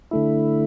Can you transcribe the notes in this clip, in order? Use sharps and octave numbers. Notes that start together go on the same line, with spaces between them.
D3 A3 E4